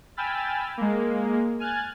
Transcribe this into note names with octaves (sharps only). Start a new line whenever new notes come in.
G5 G#5 B5 E6 F6 A6
G#3 A#3
G#5 F6 F#6 G#6 A6